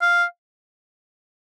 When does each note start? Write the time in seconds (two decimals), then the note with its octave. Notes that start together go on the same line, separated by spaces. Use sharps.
0.01 F5